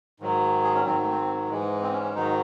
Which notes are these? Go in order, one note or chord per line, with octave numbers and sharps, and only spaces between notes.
G#2 D#3 F#3
G#4
C#4
G#2 D#3 F#3 C4
A3
C4
G#2 E3 G#3
C4
C#4
C#4
G#2 D#3 F#3 D#4